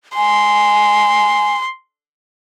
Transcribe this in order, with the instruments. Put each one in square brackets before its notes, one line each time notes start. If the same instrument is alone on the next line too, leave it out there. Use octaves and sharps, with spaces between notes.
[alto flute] G#5 [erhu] C6